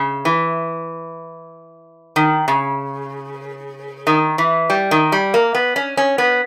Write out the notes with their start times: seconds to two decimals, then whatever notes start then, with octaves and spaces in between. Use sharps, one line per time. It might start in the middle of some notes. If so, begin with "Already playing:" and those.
Already playing: C#3
0.25 E3
2.16 D#3
2.48 C#3
4.07 D#3
4.38 E3
4.70 G3
4.91 D#3
5.12 G3
5.34 A#3
5.55 B3
5.76 C#4
5.97 C#4
6.18 B3